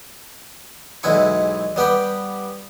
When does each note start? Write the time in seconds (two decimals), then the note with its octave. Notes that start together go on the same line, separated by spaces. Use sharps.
1.03 B1 E2 G#3 E4 C#6
1.76 G3 B3 G4 G5